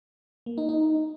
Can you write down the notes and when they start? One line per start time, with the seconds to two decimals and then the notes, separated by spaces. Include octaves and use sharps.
0.46 A#3
0.58 D#4
0.69 D#4